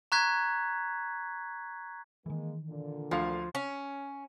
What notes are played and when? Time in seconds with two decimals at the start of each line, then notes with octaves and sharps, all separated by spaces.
0.12 A#5 C#6 F#6 G#6 B6
2.26 D#3 E3 G#3 A#3
2.68 A#2 D3
3.11 D2 F3 F5
3.55 C#4